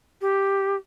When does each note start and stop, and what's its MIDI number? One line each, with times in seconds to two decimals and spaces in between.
0.21 0.76 67